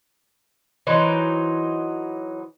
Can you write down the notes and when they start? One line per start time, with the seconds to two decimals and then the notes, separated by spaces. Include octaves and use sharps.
0.87 E3 F#3 D#4 C5